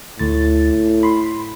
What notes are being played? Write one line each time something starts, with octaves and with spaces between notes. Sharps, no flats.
D2 A2 A6
B5 C6